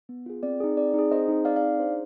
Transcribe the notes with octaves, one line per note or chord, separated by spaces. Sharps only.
B3
F4 G#4
C4 D5
D#4 G#4
C4 D5
D#4 G#4
C4 C5 D#5
D#4 G#4
C4 D5 F5
D5 F5
D#4 G#4
D4 C5